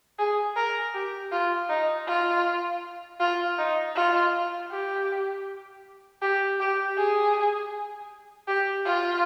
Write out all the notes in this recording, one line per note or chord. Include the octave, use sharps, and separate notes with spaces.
G#4
A#4
G4
F4
D#4
F4
F4
D#4
F4
G4
G4
G4
G#4
G4
F4